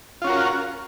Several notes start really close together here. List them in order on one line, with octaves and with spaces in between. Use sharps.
F4 C#4 F#4 A#4